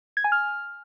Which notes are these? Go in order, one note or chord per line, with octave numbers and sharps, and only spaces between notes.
G#6
G#5
F6